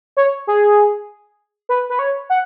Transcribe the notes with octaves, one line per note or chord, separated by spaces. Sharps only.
C#5
G#4
B4
B4
C#5
F#5